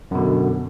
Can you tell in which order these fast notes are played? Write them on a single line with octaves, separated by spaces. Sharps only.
F#2 B2 D3